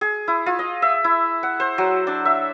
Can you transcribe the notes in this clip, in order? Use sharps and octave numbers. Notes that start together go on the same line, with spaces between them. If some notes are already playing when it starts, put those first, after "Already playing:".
G#4
E4
F4
D#5
E5
E4
F#5
C5
F#3
D4
E5